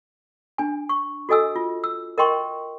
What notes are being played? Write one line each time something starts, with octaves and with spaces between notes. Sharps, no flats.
D4 G#5
C#6
F#4 A4 D#5 G#5 E6
F4
E6
A#4 D#5 G5 C6 C#6